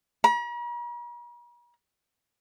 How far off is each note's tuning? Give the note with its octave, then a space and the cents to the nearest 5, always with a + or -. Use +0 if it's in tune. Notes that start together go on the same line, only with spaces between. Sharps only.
A#5 +45